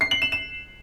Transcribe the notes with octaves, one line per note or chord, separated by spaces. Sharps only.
C7
F#7
E7
E7